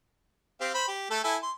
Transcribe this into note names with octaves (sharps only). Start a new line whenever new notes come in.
C4 G4 F5
C5 B5
G4
A3 A4
E4 A4 G#5
C6